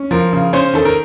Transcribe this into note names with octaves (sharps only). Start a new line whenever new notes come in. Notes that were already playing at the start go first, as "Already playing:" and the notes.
Already playing: C#4
F3 A#4
C#3
C#4 C5
D#3 A4
A#4